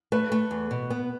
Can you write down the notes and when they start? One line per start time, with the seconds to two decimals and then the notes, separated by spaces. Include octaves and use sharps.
0.12 A3 B4
0.32 A3
0.51 E2
0.71 B2
0.90 B3